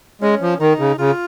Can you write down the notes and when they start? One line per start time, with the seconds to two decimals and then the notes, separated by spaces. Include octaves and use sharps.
0.21 G#3 C#4
0.41 F3
0.60 D#3 D#4
0.79 C#3
0.98 C#3 F4